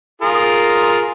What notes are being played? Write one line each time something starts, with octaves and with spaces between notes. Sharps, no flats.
F4 G#4 A#4